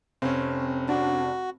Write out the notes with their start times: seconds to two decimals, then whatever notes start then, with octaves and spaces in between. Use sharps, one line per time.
0.22 F1 C4 C#4
0.89 D4 F#4